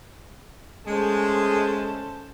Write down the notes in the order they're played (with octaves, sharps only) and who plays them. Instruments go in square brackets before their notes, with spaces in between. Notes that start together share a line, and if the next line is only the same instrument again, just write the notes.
[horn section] G#3 [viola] A3 C#4 [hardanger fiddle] C5 A5